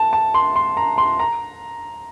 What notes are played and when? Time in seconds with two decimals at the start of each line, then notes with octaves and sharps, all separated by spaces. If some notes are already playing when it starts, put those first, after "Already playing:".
Already playing: A5
0.13 A5
0.34 C6
0.56 C6
0.77 A#5
0.98 C6
1.19 A#5